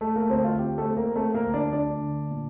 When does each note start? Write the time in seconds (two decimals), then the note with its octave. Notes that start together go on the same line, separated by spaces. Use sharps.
0.01 A3 A4
0.16 A#3 A#4
0.30 D2 C4 C5
0.44 F4
0.59 C4 G4
0.78 A3 A4
0.87 C4
0.97 A#3 A#4
1.15 A3 C4 A4
1.34 A#3 A#4
1.45 D2
1.54 D4 D5
1.73 A3 D4 D5
2.02 D3
2.31 A#2